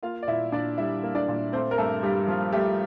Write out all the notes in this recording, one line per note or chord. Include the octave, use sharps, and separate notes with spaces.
A#3 F4 F5
D5
A#2 E4 E5
A#2 D4 D5
G3 E4 E5
A#3
D4 D5
A#2
A3 C4 C5
A#4
G2 A3 A4
G2 G3 G4
F3 F4
G3 A3 G4